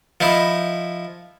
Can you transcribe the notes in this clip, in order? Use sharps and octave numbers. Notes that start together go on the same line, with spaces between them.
F3 D#4 E4